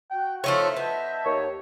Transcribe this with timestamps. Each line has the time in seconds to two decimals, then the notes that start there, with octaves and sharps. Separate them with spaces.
0.11 F#4 G5 F#6
0.44 F3 A3 D#4 C#5 E5 F5 C6
0.77 B3 D#5 A5 G6
1.26 D#2 C#5